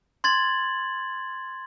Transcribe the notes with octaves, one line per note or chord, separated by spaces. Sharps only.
C6 G#6 A6 F#7